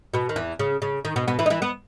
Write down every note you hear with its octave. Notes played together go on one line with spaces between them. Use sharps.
B2 B3
D#3
E2 E3
C#3
C#3
D#3
B2 B3
B2 B3
E3 E4
D#4
E3 E4
B3 B4